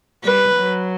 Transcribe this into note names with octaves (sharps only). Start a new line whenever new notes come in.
G3 B4
F#3